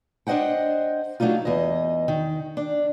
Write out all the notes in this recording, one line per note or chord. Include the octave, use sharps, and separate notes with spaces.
D4 C5 D#5 F#5 G5
F#3 A3 D4 D#4 F4
E2 D#5
D#3
D4